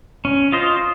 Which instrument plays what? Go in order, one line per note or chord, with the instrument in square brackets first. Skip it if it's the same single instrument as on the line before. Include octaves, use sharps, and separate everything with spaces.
[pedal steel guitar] C#4
F4 C5 D#5